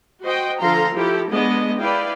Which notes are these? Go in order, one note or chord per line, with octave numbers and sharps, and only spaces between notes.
F#4 C5 D#5 G5
D3 F3 A4 F5 A#5 C6
F3 E4 G4 A4
G#3 B3 D4 D#5
E4 B4 D5 F5 G5